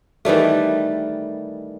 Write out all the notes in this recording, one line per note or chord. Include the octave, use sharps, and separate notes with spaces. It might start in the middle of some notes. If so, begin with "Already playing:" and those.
D#3 E3 G3 A3